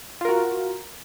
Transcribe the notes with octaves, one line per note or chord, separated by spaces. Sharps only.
F4 F#4 A#4